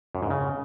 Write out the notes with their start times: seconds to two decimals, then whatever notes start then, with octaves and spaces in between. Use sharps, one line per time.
0.15 F#2
0.23 G#2
0.30 C#3